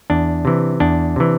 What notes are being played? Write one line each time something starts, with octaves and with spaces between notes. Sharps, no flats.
E2 D4
C3 E3
E2 D4
C3 E3